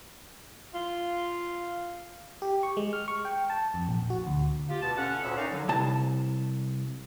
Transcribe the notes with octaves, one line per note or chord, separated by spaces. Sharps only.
F4
G4
C#6
G#3
F6
C#6
G5
A5
F2
A#1
F#4
D2
F4 G4
B2 A5
D3 C#4 F#5
D2 A#2 C#5 E5
C#4 D#4 A#4 D5 F5
D3 F#3
C2 A5